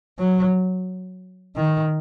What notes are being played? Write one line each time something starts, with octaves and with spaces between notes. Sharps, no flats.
F#3
D#3